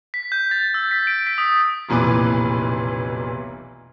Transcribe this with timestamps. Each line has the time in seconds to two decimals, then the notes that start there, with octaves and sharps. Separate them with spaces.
0.14 B6
0.32 G6
0.51 A6
0.74 E6
0.91 B6
1.07 D7
1.27 B6
1.38 D#6
1.89 F1 B1 A#2 E3 B4 D6